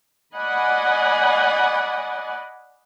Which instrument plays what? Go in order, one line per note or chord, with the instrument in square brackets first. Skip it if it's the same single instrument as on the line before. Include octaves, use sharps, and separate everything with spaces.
[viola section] D5 D#5 F#5 G#5 B5